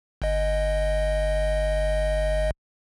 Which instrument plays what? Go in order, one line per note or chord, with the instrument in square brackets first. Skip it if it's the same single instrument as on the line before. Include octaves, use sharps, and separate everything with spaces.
[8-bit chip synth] G1 D#5